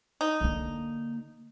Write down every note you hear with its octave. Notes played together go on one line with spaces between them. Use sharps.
D#4
D3 A#3